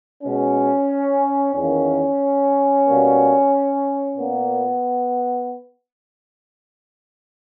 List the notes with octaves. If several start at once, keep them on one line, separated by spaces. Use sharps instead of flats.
B2 G#3 C#4
E2 D#3 A#3 C#4
B2 G3 A#3
A#2 A#3 B3